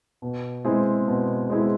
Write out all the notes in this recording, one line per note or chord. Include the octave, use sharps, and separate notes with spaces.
B2
G#3 C4 E4 G#4
B2
G#3 C4 E4 G#4